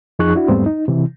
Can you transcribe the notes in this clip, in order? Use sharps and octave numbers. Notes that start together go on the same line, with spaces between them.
F2 F3 D#4 G#4 C#6 F#6
D4 E4 F#4
E2 G#2 G3 A3 B3 C4
D#4
C3 E3